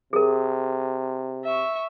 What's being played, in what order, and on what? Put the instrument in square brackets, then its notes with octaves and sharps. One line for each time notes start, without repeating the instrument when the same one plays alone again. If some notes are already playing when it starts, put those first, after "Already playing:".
[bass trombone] C3 [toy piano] G#4 A#4
[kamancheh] E5 C#6